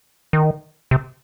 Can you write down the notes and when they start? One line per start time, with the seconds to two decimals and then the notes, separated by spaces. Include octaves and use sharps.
0.33 D#3
0.91 C3